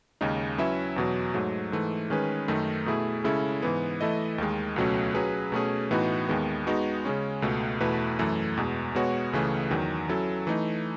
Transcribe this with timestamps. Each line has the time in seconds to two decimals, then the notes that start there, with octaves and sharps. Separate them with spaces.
0.21 D#2 C#3 G#3 D#4
0.58 F#3 C#4 E4 B4 E5
0.96 E2 B2 F#3
1.34 G#2 F#3 A3
1.72 G#2 E3 A3
2.10 D#3 G#3 C#4 G#4 B4
2.48 F#2 D#3 A3 D#4
2.86 B2 A3 E4 G#4
3.24 C#3 G#3 C#4 E4 A4
3.62 G#2 E3 B3
4.01 E3 A3 E4 A4 D#5
4.38 D#2 D#3 G#3
4.76 C#2 B2 F#3 A3 C#4
5.15 F#3 C#4 G#4 B4
5.52 B2 A3 C#4 G#4
5.91 A2 E3 B3 D#4 F#4
6.28 D#2 D#3 G#3 B3
6.67 G#3 B3 D#4 F#4
7.05 C#3 G#3 C#4
7.42 C#2 B2 A3
7.80 E2 B2 A3 E4 B4
8.19 F#2 E3 A3
8.57 E2 B2 G#3
8.95 B2 G#3 B3 F#4 C#5
9.33 C#2 C#3 E3 A3 C#4
9.71 E2 D#3 F#3
10.09 F#3 C#4 E4 A4
10.47 E3 A3 D#4